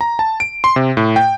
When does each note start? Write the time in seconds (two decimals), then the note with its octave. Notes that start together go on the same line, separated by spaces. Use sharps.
0.01 A#5
0.19 A5
0.40 D7
0.64 C6
0.76 C3
0.97 A2
1.16 G5